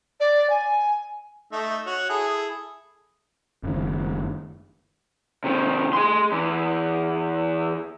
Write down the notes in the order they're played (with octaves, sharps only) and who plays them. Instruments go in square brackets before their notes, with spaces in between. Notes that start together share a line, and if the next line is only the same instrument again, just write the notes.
[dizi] D5
G#5
[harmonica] A3 D#4 E5
F#4 C#5
E4 G#4 A4
[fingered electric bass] F#1 D#3
[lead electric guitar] C3 D#3
G#4 C6
E2